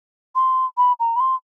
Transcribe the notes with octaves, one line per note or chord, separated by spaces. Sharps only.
C6
B5
A#5
B5
C6